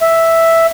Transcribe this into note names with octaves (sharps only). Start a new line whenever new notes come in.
E5